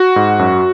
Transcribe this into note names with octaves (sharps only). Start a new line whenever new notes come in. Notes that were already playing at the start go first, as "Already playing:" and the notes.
Already playing: F#4
G#2
F#2